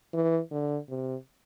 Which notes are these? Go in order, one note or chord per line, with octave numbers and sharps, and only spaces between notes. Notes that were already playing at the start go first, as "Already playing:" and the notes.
E3
D3
C3